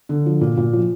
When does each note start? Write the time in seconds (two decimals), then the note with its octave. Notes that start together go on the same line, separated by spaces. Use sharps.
0.09 D3
0.26 F3
0.41 A#2
0.57 A#2
0.73 F3